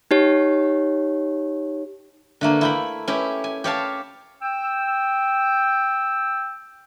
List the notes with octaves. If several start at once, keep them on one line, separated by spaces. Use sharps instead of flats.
D#4 G4 C#5
D3 A3 A#3
E4 G5 B5
C#4 E4 G4
G#5
G4 C#5 F5 A5
G5 E6